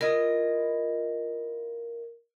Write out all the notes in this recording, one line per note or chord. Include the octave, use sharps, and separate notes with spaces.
E4 F4 A#4 D#5